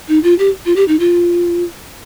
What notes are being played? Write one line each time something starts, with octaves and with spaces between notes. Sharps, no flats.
D#4
F4
G4
F4
G4
D#4
F4